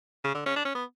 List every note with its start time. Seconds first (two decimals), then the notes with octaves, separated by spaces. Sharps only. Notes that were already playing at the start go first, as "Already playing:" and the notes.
0.24 C#3
0.35 D3
0.46 C#4
0.56 D4
0.65 C#4
0.75 B3